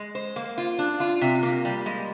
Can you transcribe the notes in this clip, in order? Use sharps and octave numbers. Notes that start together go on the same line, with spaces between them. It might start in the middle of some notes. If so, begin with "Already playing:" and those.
Already playing: G#3
C5
A#3
F4
D4
F4
C3
A#3
G3
G#3